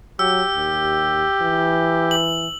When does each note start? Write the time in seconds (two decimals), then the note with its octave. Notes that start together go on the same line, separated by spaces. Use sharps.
0.19 F#3 G4 E6
0.55 D#2
1.41 E3
2.11 F#7